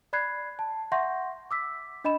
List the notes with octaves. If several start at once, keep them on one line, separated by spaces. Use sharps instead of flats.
D5 B5 F#6 G#6 C7
A5
E5 F#5 C6 C#6 G6 A#6
D6 E6 B6
D4 D#5 B5 E7